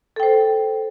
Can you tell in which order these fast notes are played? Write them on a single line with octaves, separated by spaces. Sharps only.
A4 G5 C5